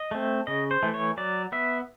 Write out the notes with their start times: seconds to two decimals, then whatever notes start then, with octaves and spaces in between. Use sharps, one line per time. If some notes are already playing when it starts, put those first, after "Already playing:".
Already playing: D#5
0.11 A3 C4
0.47 C#3 D#5
0.71 C5
0.83 E3 A3
0.94 C#5
1.17 F#3 D5
1.52 B3 E5